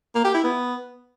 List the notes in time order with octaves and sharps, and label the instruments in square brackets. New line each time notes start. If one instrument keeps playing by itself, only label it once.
[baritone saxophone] A#3
G4
E4
B3